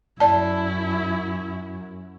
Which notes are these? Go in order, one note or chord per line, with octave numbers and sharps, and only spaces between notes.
F#2 E4 D5 A5